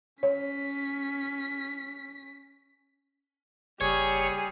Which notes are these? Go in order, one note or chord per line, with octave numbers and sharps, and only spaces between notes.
C#4 C#5 B6
F#1 G3 G#4 C#5